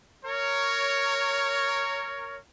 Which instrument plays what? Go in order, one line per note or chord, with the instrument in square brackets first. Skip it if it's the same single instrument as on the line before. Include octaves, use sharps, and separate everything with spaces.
[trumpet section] A#4 C#5